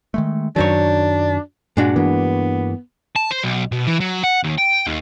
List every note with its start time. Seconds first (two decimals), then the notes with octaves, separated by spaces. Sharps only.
0.14 D#3 G#3 A3
0.56 F#2 D#3 F#3 D4 C5 C#5
1.77 G2 A#2 G#3 D4 F#4
1.96 G2 E3 A#3 B3
3.16 A5
3.31 C5
3.44 B1
3.72 B2
3.87 E3
4.00 F#3
4.24 F#5
4.44 D#2
4.58 G5
4.87 D#2